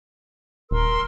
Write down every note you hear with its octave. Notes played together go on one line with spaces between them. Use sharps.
D#1 A#4 C6 E6